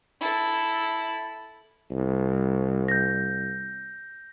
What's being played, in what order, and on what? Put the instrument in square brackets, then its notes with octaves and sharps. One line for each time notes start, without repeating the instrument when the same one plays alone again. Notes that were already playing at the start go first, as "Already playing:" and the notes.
[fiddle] E4 A4
[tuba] C2
[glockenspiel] G6 A#6